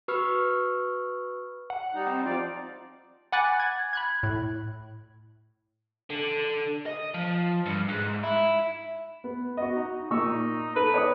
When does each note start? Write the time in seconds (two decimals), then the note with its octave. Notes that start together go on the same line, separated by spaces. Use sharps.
0.08 F#4 B4 B5 C#6 E6 F6
1.70 F#5
1.94 G3 D#4
2.07 C4
2.26 F3 F4 D5
3.32 F#5 G#5 B5 D6 F#6 A6
3.60 G#6
3.93 B5 F#6 G#6
4.23 A2
6.10 D3
6.86 D#5
7.14 F3
7.66 G2
7.88 G#2
8.23 E4
9.24 B3
9.57 B3 F#4 D#5
9.76 D#4
10.10 A#2 D#4 C#6 E6
10.76 A4 B4
10.94 C#5 D5 D#6